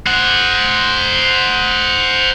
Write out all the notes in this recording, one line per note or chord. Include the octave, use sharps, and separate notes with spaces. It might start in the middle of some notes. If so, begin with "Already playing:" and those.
C5 F#5